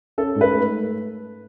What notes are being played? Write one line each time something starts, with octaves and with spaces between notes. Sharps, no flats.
C#4 A4
G#2
B4
A3